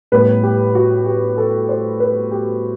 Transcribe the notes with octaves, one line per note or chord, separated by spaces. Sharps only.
A2 G3 B3 B4
G4
F#4
G4
A4
C5
B4
G4